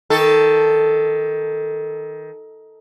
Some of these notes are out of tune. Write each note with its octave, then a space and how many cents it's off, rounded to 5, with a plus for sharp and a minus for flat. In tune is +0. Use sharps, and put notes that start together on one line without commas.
D#3 +15 A4 +0